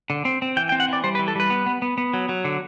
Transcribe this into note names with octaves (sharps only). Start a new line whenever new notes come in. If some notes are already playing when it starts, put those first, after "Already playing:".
D3
C4
C4
E3 G5
G5
C4
F#5
E3 D5
G3 C5
B4
E3
A4
G3 B4
B3
B3
B3
B3
F#3
F#3
D3